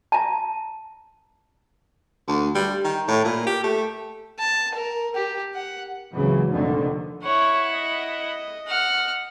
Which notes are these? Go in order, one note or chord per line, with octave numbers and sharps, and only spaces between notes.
A5 A#5
D2
G3
D#3
A2
A#2
G4
A3
A5
A#4
G4
F#5
G#1 C#2 C#3 E3 F#3
F1 F2 A#2 D3 D#3
E4 C#5 F#5
D#5
F#5 F6